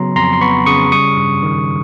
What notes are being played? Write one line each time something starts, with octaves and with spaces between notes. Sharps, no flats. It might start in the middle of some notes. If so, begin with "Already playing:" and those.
Already playing: C#3 F#3 B3 A#5 C6
F2 A#5 C6
C6
B3 B5 C#6
C#3 C#6 D#6
G3 C#6 D#6
G2
D#3